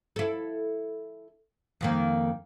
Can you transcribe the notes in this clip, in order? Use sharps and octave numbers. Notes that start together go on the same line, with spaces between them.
E4 A4
F2 D#3 A#3